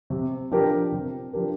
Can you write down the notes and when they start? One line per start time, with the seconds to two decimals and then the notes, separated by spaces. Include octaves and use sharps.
0.10 C3
0.51 F3 D4 G4 A#4
0.92 C3
1.33 F3 D4 G4 A#4